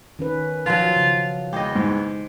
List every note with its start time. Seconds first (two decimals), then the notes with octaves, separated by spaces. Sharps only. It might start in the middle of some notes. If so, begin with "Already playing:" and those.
0.19 D#3 C#4 B4
0.66 F3 F#3 F4
0.96 C#3
1.53 E2 G#3 G4 D#5
1.75 G#2